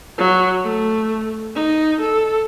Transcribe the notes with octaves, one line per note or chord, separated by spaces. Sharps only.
F#3
A3
D#4
A4